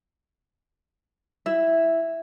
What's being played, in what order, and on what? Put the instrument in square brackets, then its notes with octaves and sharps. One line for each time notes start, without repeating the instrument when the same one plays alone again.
[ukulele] E4 E5